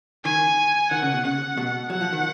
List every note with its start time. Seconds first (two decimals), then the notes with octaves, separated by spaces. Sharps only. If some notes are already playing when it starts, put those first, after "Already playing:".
0.24 D#3 G#5
0.91 D#3 F#5
1.02 C#3
1.14 B2
1.24 C#3 F#5
1.57 B2
1.90 F#3 F#5
2.01 F3
2.13 D#3